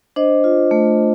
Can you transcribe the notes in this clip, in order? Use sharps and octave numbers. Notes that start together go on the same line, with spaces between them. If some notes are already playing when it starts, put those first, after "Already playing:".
D4 C5 D#5
F4
A3